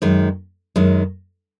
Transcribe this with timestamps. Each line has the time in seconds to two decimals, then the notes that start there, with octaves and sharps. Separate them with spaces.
0.02 F#2 D#3 G#3
0.76 F#2 D#3 G#3